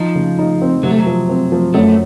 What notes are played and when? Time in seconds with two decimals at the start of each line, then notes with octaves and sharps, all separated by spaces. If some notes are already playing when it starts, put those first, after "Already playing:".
Already playing: F3 D#4
0.15 C#3
0.39 D#4
0.62 C4
0.83 C3 F#3
0.90 A3
0.98 F#3
1.06 F3
1.29 C4
1.52 F3
1.74 F#2 A3